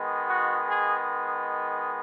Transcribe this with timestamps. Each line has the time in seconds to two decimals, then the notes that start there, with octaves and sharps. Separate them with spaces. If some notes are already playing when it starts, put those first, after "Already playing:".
Already playing: D#3 G#3 B3
0.29 F#4
0.69 G#4